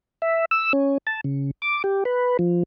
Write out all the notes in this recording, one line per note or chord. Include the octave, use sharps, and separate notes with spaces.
E5
E6
C#4
A5
C#3
D6
G4
B4
F3